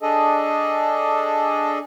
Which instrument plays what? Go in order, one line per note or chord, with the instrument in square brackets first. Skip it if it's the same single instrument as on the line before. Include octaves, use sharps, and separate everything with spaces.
[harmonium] D4 G#4 A4 D#5